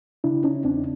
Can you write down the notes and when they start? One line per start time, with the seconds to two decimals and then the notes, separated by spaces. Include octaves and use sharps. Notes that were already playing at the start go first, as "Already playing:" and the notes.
0.24 C#3 D4 E4
0.44 C#4 D#4
0.64 E2 C4 D4